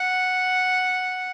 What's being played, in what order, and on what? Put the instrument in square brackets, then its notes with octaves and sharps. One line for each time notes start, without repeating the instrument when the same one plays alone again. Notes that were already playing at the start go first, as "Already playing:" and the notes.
Already playing: [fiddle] F#5